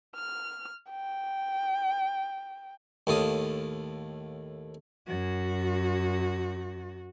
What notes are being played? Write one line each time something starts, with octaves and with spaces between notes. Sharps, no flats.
F6
G5
D#2 A2 F4 D#6
F#2 F#4